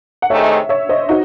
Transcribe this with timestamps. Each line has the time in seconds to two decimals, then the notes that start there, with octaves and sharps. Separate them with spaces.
0.22 F#5
0.30 C3 D#3 A3 D#4 G#4 C#5 E5
0.69 C#5 E5
0.89 C5 D#5
1.09 D#4 F#4